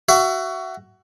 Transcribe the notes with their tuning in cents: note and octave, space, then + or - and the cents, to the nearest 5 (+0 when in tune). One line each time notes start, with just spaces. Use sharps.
F#4 +20 E5 +25